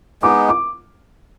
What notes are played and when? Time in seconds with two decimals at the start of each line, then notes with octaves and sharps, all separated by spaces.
0.22 G#3 B3 D#4 D6
0.49 D6